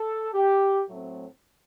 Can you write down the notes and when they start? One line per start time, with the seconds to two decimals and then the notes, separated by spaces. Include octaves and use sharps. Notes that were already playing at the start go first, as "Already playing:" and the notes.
Already playing: A4
0.34 G4
0.87 A2 F#3 A3 C4